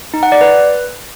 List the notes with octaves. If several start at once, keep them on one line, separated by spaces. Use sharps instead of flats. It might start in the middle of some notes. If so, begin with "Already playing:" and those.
D#4
F#5
D5
B4